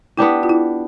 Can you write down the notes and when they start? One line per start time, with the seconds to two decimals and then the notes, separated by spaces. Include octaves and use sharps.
0.18 B3 D4 E4 G4
0.43 F4
0.49 E4